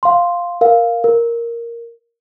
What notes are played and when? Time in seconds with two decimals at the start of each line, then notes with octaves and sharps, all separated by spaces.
0.03 F5 C6
0.61 A#4 F5
1.04 A#4